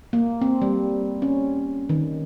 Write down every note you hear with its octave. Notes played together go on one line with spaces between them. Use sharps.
A#3
C4
G3
C#4
D#3